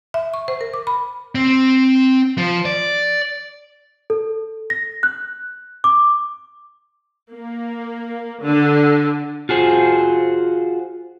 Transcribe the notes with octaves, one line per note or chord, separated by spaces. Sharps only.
E5
C#6
C5
A#4
D6
B5
C4
F3
D5
A4
A#6
F#6
D6
A#3
D3
F4 F#4 G#4 C5